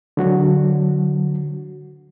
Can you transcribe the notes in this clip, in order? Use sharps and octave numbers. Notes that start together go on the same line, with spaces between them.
D3 F#3 F#4